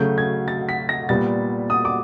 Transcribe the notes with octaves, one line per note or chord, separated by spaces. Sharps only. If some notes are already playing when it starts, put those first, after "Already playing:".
Already playing: C#3 F#3 A3 G6
G#6
A6
B6
A#6
A#2 G3 B3 A6
D#6
D6